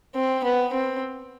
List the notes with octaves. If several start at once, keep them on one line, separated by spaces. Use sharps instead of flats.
C4
B3
C4